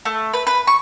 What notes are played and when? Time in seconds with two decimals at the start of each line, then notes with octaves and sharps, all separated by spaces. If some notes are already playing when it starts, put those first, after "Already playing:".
0.05 A3
0.33 B4
0.47 B4
0.67 C#6